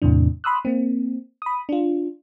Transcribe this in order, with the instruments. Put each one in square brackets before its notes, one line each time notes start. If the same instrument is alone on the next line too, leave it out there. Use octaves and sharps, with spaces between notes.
[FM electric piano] E2 A2 C3 E3 D4
B5 C6 D#6 E6 F#6
A#3 C4
B5 D#6
D4 F4